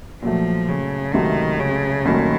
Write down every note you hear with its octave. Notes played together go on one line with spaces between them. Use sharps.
A#2 F3 F#3 A3
C#3
C#2 C3 D#3 F#3 A3
C#3
C2 A#2 D#3 F#3 A3 C#4